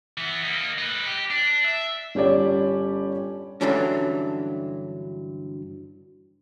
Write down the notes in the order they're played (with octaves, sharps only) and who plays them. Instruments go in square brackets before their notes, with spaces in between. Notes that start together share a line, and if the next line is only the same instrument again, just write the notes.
[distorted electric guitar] E3 B3
A#3 D#4
D#4 B4
G4
D4
E5
[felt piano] G1 C#4 G4 C#5 D5
[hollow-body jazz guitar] G2 D3 E3 F#3 C#4 D4